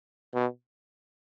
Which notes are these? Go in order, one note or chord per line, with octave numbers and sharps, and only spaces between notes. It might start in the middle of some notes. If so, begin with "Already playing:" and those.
B2